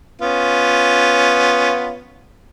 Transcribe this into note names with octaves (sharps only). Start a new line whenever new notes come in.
B3 C#4 F4